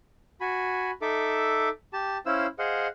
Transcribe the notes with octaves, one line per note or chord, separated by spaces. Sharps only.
F#4 G#5 B5
D#4 A4 E5 D6
G4 A5
C#4 E4 C5 F5 E6
G#4 C5 D#5 F5 F#5